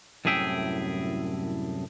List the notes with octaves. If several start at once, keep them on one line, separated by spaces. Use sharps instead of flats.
C2 F#2 A2 G#4 E5 G5